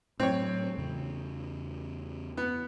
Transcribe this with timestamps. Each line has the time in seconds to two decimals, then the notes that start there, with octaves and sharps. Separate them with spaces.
0.20 A2 F#3 C4 C#5
0.77 E2 C#3
2.37 B3